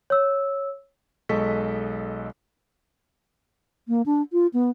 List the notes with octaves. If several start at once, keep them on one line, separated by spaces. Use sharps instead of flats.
C#5 E6
B1 G#3 A4 D#5 C#6 B6
A#3
D4
F4
B3